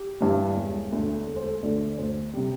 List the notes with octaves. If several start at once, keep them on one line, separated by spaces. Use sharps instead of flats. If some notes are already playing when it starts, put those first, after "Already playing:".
Already playing: G4
G2 E3 G3
E1
D2 D3 A3
E1 A4
C5
A4
D2 D3 A3 D5
D2 C5
C3 G3